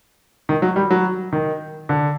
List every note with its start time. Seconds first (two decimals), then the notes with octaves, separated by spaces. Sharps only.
0.49 D#3
0.62 F#3
0.76 G3
0.90 F#3
1.33 D#3
1.89 D3